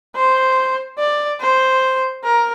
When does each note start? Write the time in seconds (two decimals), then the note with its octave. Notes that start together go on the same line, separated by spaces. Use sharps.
0.15 C5
0.99 D5
1.41 C5
2.24 A#4